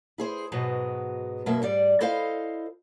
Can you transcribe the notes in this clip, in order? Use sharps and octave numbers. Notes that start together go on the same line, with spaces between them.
E4 G#4 C5
G#2 B2 F#3 G#3 B3
F#2 B2 F#3 A#3 E5
G#2 G3 D5
E4 A4 C5 D#5 F5